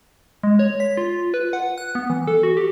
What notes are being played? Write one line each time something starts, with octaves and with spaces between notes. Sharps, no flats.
G#3
C#5
B6
F4
B4
F#5
F#6
B3
E3
A4
F#4
G4